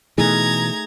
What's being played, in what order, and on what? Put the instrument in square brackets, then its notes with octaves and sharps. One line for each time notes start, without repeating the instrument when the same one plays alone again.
[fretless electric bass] B2 E3 [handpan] A3 D#4 G#4 [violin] A#5 G#6